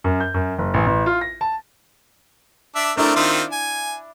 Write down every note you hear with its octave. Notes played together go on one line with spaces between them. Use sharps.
F#2
G6
F#2
F#1
A1
A1
F4
A#6
A5
D4 E5
A3 C4 D4 E4 A#4
D#3 C4 F4
G#5